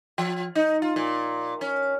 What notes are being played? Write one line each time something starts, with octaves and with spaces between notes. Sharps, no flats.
F3
D#4
F4
A#2
C#4